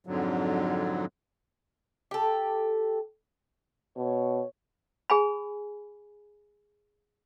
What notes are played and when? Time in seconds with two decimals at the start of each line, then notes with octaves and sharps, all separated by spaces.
0.07 F2 G#2 D3 F#3
2.11 G4 A4
3.96 B2 C#5
5.10 G#4 G#5 B5